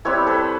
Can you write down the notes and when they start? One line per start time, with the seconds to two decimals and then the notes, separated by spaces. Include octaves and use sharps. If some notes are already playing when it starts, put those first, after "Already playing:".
0.05 G3 C4 E4 B4 C#5
0.27 A4 B4